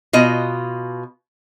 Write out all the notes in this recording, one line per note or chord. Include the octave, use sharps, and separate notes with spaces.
B2 F4 D#5